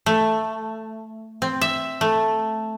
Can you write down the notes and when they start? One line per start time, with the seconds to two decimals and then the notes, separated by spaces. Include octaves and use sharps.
0.06 A3
1.42 C4
1.61 E5
2.01 A3